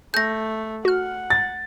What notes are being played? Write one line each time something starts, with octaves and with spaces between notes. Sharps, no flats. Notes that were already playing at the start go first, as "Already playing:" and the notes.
A3 G6 A#6
F#4 F#5 F6
A6